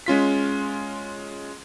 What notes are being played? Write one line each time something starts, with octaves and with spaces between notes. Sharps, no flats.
G#3 C#4 F4 B6